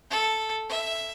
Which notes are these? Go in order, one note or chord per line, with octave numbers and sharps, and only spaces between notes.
A4
E5